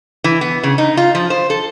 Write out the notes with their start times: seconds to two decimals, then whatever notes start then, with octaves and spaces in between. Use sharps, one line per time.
0.24 E3
0.41 B3
0.63 C#3
0.78 D#4
0.97 F4
1.15 F3
1.30 C5
1.50 A4